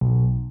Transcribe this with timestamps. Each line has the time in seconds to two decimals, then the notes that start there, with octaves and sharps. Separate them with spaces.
0.01 B1